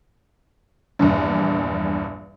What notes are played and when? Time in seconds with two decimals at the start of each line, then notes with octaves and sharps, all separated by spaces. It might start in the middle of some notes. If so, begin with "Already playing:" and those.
0.99 A#1 E2 G2